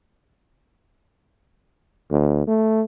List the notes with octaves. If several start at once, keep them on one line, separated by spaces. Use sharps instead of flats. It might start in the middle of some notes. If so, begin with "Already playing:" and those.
D2
A3